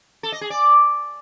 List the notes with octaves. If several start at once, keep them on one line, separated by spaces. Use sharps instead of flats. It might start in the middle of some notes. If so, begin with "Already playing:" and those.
A4
D#5
G#4
D5